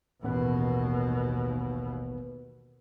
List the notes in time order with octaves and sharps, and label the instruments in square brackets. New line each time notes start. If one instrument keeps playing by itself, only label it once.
[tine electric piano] A1 B3 B4 [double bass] D#2 B2